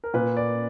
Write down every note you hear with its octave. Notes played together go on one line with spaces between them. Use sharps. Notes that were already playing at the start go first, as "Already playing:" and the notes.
A#4
A#2 B4
D5